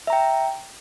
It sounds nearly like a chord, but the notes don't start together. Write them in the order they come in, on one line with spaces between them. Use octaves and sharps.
E5 A#5 G5